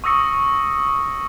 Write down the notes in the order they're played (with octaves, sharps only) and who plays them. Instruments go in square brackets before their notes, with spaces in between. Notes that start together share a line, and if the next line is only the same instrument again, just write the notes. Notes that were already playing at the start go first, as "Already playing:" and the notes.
[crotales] C#6 D#6 E6 A#6 C#7